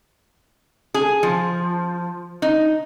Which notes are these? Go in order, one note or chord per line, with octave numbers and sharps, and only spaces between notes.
G#4
F3
D#4